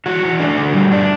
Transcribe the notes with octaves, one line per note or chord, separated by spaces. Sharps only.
E3 F#4
E3
D4
D3
G3
D4